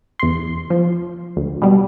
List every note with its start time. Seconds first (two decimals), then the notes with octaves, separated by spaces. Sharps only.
0.19 E2 C6
0.70 F3
1.37 D2
1.62 B2 G3